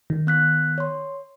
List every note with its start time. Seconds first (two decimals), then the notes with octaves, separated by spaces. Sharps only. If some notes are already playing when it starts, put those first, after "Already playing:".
0.10 D#3
0.27 B3 F#6 B6
0.78 C#5 C6